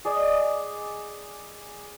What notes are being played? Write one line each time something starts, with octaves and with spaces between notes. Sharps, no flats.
G#4 D5 D#5